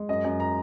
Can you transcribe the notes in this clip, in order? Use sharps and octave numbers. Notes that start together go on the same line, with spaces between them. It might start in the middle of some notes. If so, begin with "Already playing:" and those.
Already playing: G#3
F#2 D#5
F#2 D#5
A#5